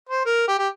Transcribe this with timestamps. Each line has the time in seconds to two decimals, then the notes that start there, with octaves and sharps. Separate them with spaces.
0.09 C5
0.25 A#4
0.48 G4
0.58 G4